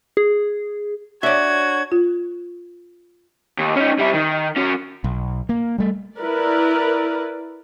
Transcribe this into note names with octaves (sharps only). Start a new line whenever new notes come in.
G#4
D4 F#4 C#5 D5 E5 G#6
F4
D#2
C#4 D#4
G3 E4
D#3
F#3 C#4
B1
A#3
G3 A3
E4 A#4 B4 D5